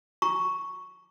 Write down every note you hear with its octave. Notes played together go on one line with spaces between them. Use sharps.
A#5 C#6